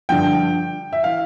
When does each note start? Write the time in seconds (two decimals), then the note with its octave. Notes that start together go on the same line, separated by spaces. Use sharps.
0.09 G2 D3 F3 G5
0.92 E5
1.04 E3 F5